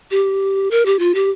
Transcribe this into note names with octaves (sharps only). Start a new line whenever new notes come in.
G4
A#4
G4
F4
G4